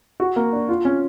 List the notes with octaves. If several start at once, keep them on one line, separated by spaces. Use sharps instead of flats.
F#4
A#3
D4
F4
C#4